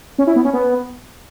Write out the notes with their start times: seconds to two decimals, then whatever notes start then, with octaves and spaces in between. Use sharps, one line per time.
0.18 C#4
0.27 E4
0.36 B3
0.45 C#4
0.53 B3